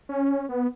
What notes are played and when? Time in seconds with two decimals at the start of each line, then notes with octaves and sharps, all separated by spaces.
0.09 C#4
0.49 B3